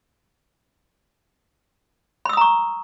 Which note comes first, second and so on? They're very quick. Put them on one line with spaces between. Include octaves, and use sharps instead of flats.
B5 E6 D#6 A#5 C#6